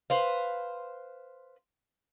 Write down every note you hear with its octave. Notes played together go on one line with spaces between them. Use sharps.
B4 C5 F5